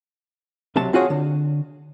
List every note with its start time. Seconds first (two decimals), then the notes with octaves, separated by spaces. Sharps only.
0.76 B1 C3 F#3 A5
0.93 C4 F4 F#4 G#4 C#5 F#5
1.10 D3